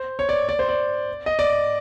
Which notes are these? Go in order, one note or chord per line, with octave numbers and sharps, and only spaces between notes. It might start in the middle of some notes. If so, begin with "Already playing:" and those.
Already playing: C5
C#5
D5
D5
C5
D5
D#5
D5